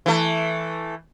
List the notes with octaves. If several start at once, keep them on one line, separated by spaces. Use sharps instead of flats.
E3 A3